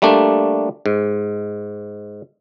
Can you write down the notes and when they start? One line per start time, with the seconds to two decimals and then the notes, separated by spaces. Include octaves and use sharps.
0.02 G3 A3 A#3 D4
0.86 G#2